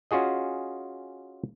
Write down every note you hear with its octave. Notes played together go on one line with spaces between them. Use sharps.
C#4 F4 F#4 G#4 D#5